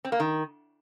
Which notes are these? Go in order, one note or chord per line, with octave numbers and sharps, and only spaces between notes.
C4
A#3
D#3